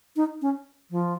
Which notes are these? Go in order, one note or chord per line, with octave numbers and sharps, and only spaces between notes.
D#4
C#4
F3